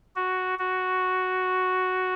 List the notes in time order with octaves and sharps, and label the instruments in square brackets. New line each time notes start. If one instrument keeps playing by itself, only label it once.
[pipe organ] F#4
F#4